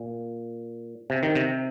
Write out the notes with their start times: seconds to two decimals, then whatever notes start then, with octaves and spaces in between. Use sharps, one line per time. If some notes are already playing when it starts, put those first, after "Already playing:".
Already playing: A#2
1.10 C3
1.23 D#3
1.35 C3